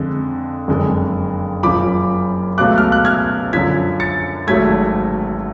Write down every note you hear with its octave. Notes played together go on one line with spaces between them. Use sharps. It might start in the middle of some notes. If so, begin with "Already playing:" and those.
Already playing: F2 D3 G#3
F#1 F2 D3 G#3
F#1 F#2 F3 B5 D6
C#2 B2 F#3 A3 D6 F#6
F6
F#6
F6 G#6
F#2 D3 F3 G#6 B6
A6 C#7
G#1 G#2 F#3 A3 G#6 B6